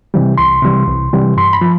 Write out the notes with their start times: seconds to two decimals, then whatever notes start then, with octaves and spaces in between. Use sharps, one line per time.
0.14 C3 E3 G3
0.38 C2 C6
0.62 C3 E3 G3
0.88 C2
1.13 C3 E3 G3
1.37 G2 C6
1.53 B5
1.61 F3